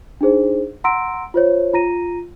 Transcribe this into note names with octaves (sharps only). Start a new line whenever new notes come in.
D4 D#4 G#4 C5
F#5 A#5 C6 E6 A#6 D7
F4 C5 C#5
F4 A#5 A#6 D#7